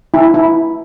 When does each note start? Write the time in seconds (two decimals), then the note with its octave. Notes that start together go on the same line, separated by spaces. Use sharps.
0.14 E4
0.34 E4